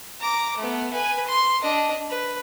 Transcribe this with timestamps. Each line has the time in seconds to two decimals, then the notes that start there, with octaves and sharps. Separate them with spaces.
0.20 A#5 D6
0.57 A3 B3
0.92 B4 G#5
1.27 C6
1.62 D4 D#5
2.09 B4